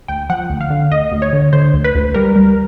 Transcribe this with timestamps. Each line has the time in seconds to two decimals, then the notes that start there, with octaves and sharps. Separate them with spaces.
0.08 D2 G5
0.30 F3 F#5
0.50 D2
0.61 F5
0.70 D3
0.91 D2 D#5
1.11 D2
1.22 C#5
1.33 D3
1.53 D3 C5
1.73 D2
1.84 B4
1.95 D2
2.14 G3 A#4
2.36 G3